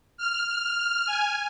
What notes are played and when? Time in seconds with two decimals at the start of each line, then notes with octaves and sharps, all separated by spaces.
0.17 F6
1.06 G#5